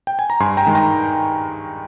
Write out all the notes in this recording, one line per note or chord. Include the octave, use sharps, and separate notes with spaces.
G5
G#5
A#5
G2 G#5 C6
G5 A#5
D#3 G#3
G5 A#5